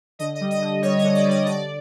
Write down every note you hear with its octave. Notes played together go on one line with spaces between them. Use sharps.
D3 D#5
D#5
G3
D#5
D3
G3 C#5
D#5
D3
D5
G3
D#5
D3 D5